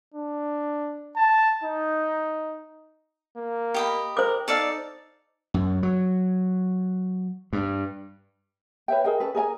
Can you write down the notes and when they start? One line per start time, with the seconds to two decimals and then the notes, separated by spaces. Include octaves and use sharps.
0.14 D4
1.17 A5
1.64 D#4
3.36 A#3
3.74 G4 D#5 B5
4.17 A#4 C5 D6
4.48 D#4 A4 D5 F5
5.54 F#2
5.83 F#3
7.53 G2
8.88 B4 C#5 E5 G5
9.04 G#4 A#4 D#5 G5
9.20 C#4 A4 B4
9.35 G#4 A#4 D5 G#5